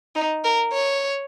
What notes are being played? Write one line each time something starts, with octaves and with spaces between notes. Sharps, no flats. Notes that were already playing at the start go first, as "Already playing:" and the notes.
D#4
A#4
C#5